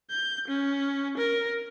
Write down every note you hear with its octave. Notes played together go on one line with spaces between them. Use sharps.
G6
C#4
A#4